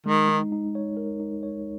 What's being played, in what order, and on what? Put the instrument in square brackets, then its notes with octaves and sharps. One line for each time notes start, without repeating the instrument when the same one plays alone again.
[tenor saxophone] D#3 [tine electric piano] G#3
[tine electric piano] D#4
D#4
C#5
A#4
D#4
C#5